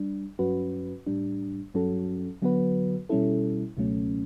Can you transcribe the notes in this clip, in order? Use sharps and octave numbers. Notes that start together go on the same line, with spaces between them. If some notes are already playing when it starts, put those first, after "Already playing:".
Already playing: G3 D4
G2 F#3 C#4 F#4 B4
A2 G3 D4
G2 F#3 C#4 F#4 A4
D3 F#3 B3 F#4 B4
B2 G3 C#4 E4 A4
C#2 B2 F#3 A3 C#4